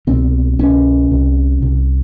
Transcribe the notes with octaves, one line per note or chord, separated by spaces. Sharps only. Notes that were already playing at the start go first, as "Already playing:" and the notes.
C2 B2 C4
C2 B2 C#4
C2 C3
C2 C3